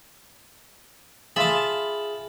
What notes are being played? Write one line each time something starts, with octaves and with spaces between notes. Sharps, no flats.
F4 G#4 E5 A5 B5